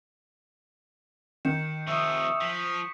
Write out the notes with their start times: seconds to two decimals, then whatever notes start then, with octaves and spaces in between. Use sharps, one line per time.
1.45 D#3 G6 C#7 E7
1.87 C3 F3 E5 C#6 D#6 E6
2.41 F3 B6